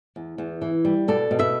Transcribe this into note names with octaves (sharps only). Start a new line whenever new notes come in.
E2
E2
E3
G3
B2 A4 D5
B2
B4 E5